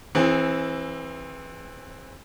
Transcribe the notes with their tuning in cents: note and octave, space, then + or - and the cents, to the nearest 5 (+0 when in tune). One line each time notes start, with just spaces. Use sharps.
E3 +0 C4 +25 G#4 +0